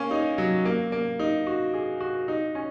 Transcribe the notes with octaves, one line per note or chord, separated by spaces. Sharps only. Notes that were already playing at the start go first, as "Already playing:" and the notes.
Already playing: A#3 C#4
D#4
F#3
A#3
A#3
D#4
F#4
G#4
F#4
D#4
C#4